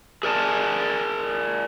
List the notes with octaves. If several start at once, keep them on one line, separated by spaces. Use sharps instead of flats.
G#4 A#4 D5 G#5 A5